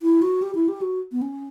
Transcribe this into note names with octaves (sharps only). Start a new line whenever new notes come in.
E4
F#4
G4
E4
G4
F#4
B3
C#4